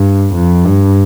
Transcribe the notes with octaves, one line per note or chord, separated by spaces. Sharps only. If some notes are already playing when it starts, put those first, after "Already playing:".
Already playing: G2
F2
G2